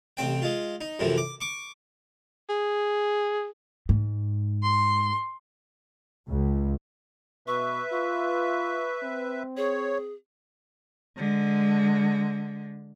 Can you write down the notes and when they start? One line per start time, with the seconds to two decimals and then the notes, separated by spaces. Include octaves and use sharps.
0.17 A1 C3 C4 G5
0.42 G#3 F4
0.81 D#4
0.99 F#2 A2 C3 E3 F3
1.18 D6
1.41 C#6 D6
2.50 G#4
3.89 G#2
4.62 C6
6.31 C#2
7.48 B2 B4 E5 C#6
7.92 F4 C#6
9.03 C4
9.57 G#4 C#5
11.17 D3 G#3